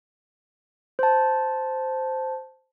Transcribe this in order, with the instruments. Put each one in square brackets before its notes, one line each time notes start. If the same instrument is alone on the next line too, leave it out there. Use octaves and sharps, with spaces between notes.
[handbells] C5 A5